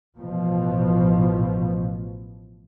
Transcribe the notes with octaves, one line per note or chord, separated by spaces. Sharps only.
A1 B2 F3